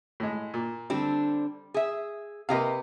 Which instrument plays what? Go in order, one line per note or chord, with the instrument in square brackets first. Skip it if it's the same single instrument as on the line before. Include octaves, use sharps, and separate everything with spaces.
[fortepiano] A2 G#3
A#2
[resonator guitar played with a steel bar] D3 C4 D4 [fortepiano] G3
[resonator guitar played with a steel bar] G#4 E5
[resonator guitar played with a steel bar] C3 G4 B4 [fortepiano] A#3 D#5 F5